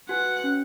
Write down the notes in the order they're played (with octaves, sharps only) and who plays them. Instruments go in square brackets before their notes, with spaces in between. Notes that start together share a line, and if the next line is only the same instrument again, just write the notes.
[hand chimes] F#4 B4 G#5 [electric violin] F#5
[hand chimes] C#4